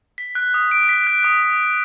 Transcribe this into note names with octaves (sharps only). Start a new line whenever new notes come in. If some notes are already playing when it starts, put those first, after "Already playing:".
B6
F#6
D#6
D7
B6
F#6
D#6